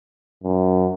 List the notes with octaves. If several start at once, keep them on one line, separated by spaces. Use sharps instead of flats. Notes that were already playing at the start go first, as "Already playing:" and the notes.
F#2